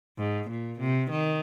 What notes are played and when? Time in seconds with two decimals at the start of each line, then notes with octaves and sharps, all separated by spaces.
0.18 G#2
0.50 A#2
0.80 C3
1.10 D#3